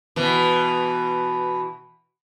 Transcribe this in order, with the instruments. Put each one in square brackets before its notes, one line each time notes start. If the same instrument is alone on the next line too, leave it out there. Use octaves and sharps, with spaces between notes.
[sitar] B2 E3